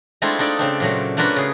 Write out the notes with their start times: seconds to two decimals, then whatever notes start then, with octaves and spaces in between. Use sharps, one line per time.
0.22 G#3 A3 C4 D4 E4 F4
0.39 D4 D#4 A4 D5
0.59 C#3 C4 D4
0.80 A#2 F#3 A3
1.17 A3 A#3 D4 F4 F#4 B4
1.36 C#3 G#4